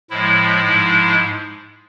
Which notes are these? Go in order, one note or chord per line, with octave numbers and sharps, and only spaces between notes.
A2 F3 G#3 E4
G#2 F3 G#3